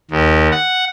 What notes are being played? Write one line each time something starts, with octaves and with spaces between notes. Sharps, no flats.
D#2
F#5